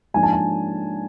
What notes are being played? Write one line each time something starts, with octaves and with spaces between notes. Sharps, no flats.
G#2 F3 A#3 D4 G#5
A5
G#5